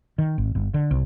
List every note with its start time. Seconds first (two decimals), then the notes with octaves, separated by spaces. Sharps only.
0.18 D#3
0.38 G#1
0.55 G1
0.74 D3
0.91 C2